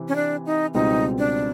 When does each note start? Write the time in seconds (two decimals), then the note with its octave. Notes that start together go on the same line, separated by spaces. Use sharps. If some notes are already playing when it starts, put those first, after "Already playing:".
Already playing: C3 E3
0.08 C#4
0.16 D4
0.46 D#4
0.74 C#2 B2 G3 C4 D#4
1.18 D4